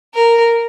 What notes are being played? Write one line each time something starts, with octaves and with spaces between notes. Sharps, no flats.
A#4